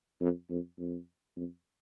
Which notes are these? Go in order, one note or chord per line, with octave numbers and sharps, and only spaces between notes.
F2
F2
F2
F2